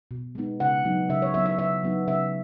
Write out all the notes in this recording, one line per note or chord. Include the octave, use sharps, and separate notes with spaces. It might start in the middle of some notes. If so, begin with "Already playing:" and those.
B2
G#3 B3 D#4
C#3 F#5
F#3 B3 D#4
C#3 E5
C#5
F#3 B3 D#4 E5
E5
C#3 E5
F#3 B3 D#4
C#3 E5